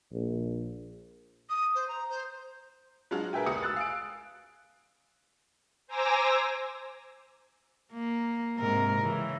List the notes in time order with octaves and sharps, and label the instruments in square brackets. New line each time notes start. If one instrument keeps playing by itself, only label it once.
[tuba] A#1
[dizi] D#6
C5
A#5
C5
[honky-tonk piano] F#3 G#3 D4 F4 F#4
G#4 A#4 B4 E5 G5 G#5
F1 C#2 F#4 D#6 C#7
E6 F#6 A6
F5 G#5 D7
[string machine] C5 G#5 A#5 D6 E6 A#6
[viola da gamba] A#3
G#2 C3 A#4
C#3 E3